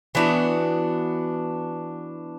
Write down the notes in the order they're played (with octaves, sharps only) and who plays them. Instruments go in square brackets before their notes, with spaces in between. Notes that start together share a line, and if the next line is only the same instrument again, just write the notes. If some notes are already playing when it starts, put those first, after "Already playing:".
[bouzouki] E3 B3 D4 F#4